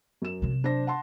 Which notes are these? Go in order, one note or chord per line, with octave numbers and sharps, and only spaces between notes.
F#2 E7
C3 F#3
D4 C5 A#6
F#5 A5 C6